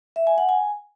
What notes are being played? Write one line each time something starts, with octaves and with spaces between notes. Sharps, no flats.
E5
G#5
F#5
G#5